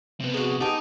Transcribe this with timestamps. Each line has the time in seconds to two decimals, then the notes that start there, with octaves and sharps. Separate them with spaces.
0.20 C3 B3
0.34 G#3 F#4
0.60 B3 D#4 G4 G#4 G5 A5